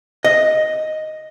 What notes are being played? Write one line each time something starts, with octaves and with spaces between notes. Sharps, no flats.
D#5